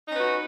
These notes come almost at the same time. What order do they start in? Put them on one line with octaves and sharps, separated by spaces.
D#4 C#4 B4 F#4